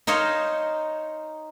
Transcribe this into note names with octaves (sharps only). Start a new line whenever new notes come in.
D#4 C5 C#5 D#5 F5